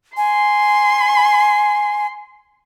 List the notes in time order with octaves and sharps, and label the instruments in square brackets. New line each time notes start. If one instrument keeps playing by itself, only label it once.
[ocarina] G#5 [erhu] C6